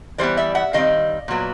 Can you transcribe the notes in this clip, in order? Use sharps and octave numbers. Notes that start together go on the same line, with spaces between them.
E3 G3 B3 C5 D5
D5 E5
E5 F#5
D#3 G3 C4 D#5 F5
A#2 F#3 B3